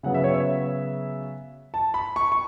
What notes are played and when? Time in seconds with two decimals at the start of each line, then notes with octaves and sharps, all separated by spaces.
0.03 C#3 F#3 B3 F#5
0.14 E5
0.24 C#5
0.34 E5
1.74 A5
1.94 B5
2.16 C#6
2.32 C#6